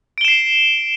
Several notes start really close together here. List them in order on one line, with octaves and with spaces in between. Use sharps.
D7 G7 E7 C7